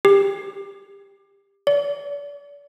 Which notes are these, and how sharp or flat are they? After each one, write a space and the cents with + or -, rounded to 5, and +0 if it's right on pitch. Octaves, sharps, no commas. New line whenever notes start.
G4 +25
D5 -40